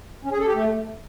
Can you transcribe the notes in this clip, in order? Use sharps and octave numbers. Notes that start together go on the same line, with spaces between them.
C#4
G#4
A4
G4
A3